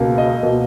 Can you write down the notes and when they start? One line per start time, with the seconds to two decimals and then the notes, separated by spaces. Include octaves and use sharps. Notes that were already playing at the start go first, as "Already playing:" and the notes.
Already playing: C#2 B2 A#3
0.18 D#5
0.43 B2 A#3